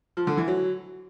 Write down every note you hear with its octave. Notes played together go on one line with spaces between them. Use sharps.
F3
D3
E3
F#3